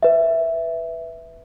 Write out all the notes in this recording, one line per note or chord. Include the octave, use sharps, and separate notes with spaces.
B4 E5